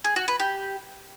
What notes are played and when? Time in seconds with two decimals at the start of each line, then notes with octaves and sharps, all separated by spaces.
0.04 G#4
0.16 F#4
0.28 B4
0.40 G4